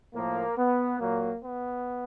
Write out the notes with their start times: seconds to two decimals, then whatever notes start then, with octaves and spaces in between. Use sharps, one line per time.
0.14 A2 F3 A#3
0.57 B3
0.99 A#2 F#3 A#3
1.43 B3